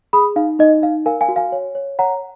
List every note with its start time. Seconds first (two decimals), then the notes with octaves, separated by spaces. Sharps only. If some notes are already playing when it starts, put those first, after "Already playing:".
0.13 G#4 B5 D#6
0.36 D#4 F5
0.59 D#4 D#5
0.82 D#4 F5
1.06 A#4 F5 G#5
1.21 F5 G#5
1.28 F#4
1.36 F5 G#5
1.52 C#5
1.75 C#5
1.99 C#5 F#5 A#5